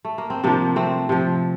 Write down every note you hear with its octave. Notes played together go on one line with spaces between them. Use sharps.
A3
A#3
C4
C3 F3 A#3 D4
A3 C4
C3 F3